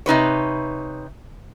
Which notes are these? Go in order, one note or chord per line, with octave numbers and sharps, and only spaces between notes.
C3 D#4 B4 C#5